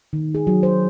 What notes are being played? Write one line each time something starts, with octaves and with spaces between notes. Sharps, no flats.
D#3
G#4
F#3
C5